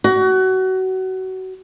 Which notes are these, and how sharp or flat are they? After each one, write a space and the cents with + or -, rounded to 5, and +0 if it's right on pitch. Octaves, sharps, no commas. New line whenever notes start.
F#4 +25